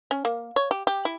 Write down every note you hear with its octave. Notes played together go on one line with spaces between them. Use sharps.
C#4
A#3
C#5
G4
G4
E4